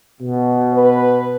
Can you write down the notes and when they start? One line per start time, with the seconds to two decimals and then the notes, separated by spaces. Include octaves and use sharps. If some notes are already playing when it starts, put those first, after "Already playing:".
0.20 B2
0.74 B4